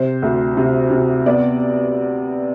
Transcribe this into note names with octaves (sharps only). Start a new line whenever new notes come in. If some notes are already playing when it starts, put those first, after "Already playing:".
Already playing: C3 C5
D2
C3
C3
B3 D5